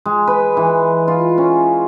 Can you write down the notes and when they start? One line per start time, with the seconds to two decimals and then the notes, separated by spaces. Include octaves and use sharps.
0.06 G#3
0.27 B4
0.57 E3
1.08 F4
1.38 C#4